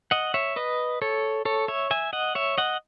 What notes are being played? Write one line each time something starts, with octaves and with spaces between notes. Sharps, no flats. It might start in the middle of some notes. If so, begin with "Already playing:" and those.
D#5 F#5
C#5 E5
B4 D#5
A4 C#5
A4 C#5
C#5 E5
E5 G#5
D#5 F#5
C#5 E5
D#5 F#5